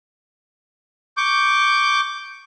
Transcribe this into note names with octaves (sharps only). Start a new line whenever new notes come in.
C#6 D6 G6